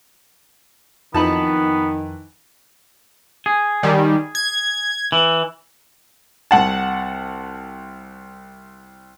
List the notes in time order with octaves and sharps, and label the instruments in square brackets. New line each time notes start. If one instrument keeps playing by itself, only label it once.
[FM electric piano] F2 D#4 F#6 [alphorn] D#3 [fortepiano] E3 B4 A5 [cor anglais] B3
[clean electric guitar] G#4
[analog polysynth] D#3 G3
G#6
[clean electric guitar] E3
[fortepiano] C2 F#5 A5